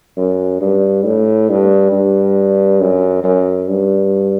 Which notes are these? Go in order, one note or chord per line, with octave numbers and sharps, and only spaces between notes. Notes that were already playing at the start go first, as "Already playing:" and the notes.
F#2
G2
A2
G2
G2
F#2
F#2
G2